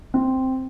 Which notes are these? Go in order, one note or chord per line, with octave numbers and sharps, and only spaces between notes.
C4